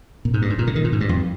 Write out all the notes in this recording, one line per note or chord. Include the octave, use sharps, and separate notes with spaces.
A#2
G#2
G2
G#2
A#2
D3
D#3
A#2
G#2
G2
F2